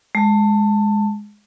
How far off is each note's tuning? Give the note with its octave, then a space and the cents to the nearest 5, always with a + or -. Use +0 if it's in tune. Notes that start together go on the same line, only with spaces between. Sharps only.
G#3 +0 A5 +20